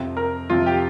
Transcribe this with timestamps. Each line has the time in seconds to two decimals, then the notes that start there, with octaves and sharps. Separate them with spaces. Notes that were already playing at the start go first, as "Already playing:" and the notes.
Already playing: F2 C3 F3 C4
0.17 A#4
0.50 F2 C3 F3 C4 F4
0.66 G4